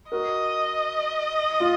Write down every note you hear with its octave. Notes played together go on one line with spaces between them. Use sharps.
F#4 A#4 D#5
F4